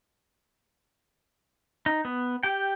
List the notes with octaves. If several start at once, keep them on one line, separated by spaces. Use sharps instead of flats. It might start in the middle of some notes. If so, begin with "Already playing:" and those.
D#4
B3
G4 G5